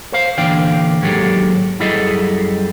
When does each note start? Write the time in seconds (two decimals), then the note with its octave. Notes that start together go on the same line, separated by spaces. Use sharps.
0.13 C5 F5
0.38 A#2 D3 E3 D4 F5 G5
1.02 D#2 G#2 F#3 G#3 G4 A4
1.80 F#2 G3 E4 G#4 A4 D#5